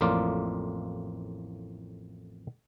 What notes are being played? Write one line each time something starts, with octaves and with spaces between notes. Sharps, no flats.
A1 F2 A2 A#3 F4 D5